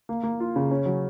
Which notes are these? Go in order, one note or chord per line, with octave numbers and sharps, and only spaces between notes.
A#3
A#3
F4
C#3
C#4
F#3